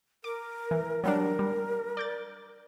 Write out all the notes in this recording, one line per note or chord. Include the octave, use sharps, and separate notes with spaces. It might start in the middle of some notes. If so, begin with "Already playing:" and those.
A#4 D6
E3
F#3 G3 D4 A#4
G3
D5 G6 A6